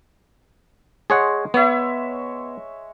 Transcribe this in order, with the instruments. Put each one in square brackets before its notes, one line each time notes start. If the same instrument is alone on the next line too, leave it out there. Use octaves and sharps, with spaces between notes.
[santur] G#3 [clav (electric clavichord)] G#4 C#5 F#5
[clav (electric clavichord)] B3 [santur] C#5 E5